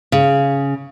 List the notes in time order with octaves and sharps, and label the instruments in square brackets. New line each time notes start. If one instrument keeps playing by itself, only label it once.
[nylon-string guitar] C#3